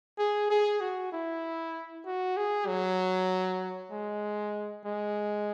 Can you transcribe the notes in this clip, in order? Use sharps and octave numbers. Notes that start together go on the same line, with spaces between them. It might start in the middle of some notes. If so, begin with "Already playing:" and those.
G#4
G#4
F#4
E4
F#4
G#4
F#3
G#3
G#3